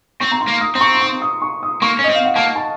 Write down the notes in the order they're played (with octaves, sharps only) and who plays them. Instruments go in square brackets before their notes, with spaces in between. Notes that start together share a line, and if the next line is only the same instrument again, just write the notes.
[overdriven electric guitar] C4 [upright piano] C#6
[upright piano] A#5
C6
[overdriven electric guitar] A#3
[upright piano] D#6
[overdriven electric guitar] C4 [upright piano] C6
[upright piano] C#6
C6
C#6
D#6
C#6
D#6
[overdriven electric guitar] A#3 [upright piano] C#6
[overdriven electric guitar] C#4
[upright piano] D#5
[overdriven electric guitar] C4
[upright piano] F5
F#5
[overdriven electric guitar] A#3 [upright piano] A5
[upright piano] A5